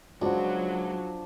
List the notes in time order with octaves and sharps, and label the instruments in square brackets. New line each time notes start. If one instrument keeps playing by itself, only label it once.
[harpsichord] C#2 [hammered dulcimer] F3 D4 [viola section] F#3 [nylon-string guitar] F#4 F#5